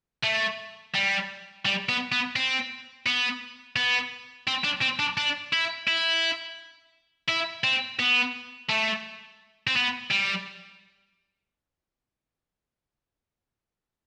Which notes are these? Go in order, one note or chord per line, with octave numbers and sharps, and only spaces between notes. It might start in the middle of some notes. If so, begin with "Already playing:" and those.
A3
G3
G3
B3
B3
C4
B3
B3
C4
D4
C4
D4
D4
E4
E4
E4
C4
B3
A3
C4
B3
G3